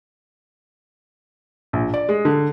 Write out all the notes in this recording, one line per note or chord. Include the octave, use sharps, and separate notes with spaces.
A#1
D5
G#3
D3